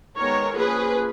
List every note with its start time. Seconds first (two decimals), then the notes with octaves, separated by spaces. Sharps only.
0.17 D#3 G#3 B3 A#4 C#5
0.57 F3 A#3 C#4 G#4 B4